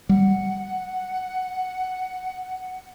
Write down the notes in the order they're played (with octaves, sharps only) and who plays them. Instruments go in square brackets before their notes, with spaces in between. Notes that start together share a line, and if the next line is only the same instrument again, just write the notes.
[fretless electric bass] G3 [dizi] F#5